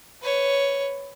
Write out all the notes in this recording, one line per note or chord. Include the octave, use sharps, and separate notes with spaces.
B4 C#5